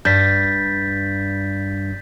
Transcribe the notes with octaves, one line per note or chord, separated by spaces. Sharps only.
G2 G6 A6 B6